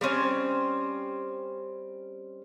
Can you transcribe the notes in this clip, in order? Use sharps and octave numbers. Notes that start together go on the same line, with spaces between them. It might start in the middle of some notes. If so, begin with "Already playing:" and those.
G3 C4 C#4 C5